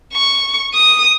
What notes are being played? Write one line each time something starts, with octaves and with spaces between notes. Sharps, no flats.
C#6
D#6